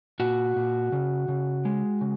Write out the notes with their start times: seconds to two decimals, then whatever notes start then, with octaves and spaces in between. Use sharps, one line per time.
0.20 A#2 F#4
0.56 A#2
0.92 C#3
1.28 C#3
1.65 G#3
2.01 C#3